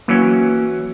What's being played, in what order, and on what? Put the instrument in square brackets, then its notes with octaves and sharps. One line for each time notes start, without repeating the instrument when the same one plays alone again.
[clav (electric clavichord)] E3 F#3 C#4 [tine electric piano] A#3